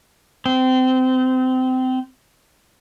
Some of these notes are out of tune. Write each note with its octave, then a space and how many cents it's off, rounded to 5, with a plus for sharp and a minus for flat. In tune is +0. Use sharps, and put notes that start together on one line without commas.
C4 -25